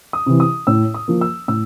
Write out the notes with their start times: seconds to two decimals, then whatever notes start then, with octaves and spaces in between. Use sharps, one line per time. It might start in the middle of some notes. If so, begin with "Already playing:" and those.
0.13 D#6
0.26 C3 E3
0.40 D#6
0.67 A2 E6
0.94 D#6
1.08 F3 A#3
1.21 E6
1.48 A2 E6